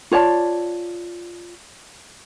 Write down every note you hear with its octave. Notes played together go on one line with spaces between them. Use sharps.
F4 C#5 D5 A5